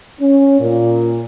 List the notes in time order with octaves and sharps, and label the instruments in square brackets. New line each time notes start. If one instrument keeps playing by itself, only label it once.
[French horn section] C#4
A#2